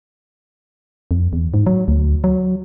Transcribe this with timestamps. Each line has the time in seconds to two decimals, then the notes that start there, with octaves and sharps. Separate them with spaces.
1.11 F2
1.33 E2
1.54 G#2
1.66 F#3
1.88 D2
2.24 F#3